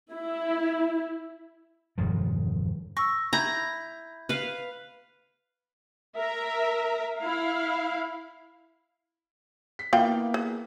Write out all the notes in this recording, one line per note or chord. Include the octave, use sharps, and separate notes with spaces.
E4
E1 G2 D#3 F3
C#6 E6 A#6
E4 A#5 B5 G6
B4 F5
A#4 E5 A#5
E4 F5
B6
A#3 B3 E4 F4 F5 G5
G#4